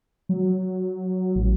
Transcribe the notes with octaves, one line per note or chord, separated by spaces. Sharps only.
F#3
A1